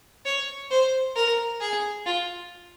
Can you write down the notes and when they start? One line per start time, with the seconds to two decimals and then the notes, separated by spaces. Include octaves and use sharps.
0.25 C#5
0.71 C5
1.16 A#4
1.61 G#4
2.06 F4